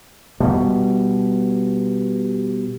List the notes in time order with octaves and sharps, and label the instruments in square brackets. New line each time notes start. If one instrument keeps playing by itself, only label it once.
[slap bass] B2 G3